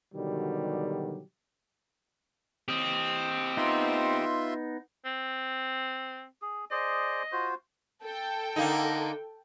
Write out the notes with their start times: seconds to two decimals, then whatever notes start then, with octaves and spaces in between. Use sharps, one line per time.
0.15 B2 D3 D#3 F#3 G3 G4
2.68 C4 G4 D#5
3.57 B3 D#4 F4 E5 C6
5.05 C4
6.42 G#4
6.71 G#4 C5 D5 D#5
7.32 F4 F#4 C5
8.03 A4 G5
8.56 D3 A#3 D#4